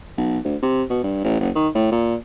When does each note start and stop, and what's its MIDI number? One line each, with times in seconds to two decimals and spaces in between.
0.18 0.38 35
0.44 0.56 38
0.62 0.83 48
0.90 0.99 47
1.03 1.22 43
1.24 1.38 33
1.40 1.50 30
1.55 1.68 51
1.75 1.91 45
1.92 2.15 46